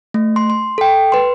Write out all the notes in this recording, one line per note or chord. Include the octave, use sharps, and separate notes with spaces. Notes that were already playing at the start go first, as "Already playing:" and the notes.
A3
C6
C6
A4 G5
B4 C6